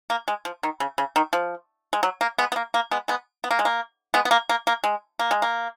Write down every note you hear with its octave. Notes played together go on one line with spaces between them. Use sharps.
A#3
G#3
F3
D#3
C#3
C#3
D#3
F3
G#3
F#3
A#3
G#3 B3
B3
A#3
A#3
G#3 B3
G#3 B3
B3
A#3
G#3
A#3
G#3 B3
B3
A#3
A#3
A#3
G#3
A#3
G#3
A#3